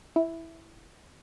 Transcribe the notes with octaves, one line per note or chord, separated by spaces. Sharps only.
E4